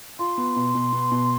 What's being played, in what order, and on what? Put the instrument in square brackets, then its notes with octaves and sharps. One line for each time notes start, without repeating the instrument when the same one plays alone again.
[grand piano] F4 [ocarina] C6
[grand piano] B3
B2
B2
B3
B2